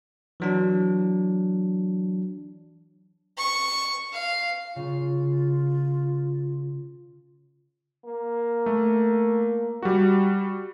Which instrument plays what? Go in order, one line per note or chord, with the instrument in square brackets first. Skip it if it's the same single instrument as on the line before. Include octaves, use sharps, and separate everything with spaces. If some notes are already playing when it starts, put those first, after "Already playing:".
[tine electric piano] E3 F#3 D4
[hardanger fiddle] C#6
F5
[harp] C#3 C#4 [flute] F4
[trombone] A#3
[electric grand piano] A3
G3 F#4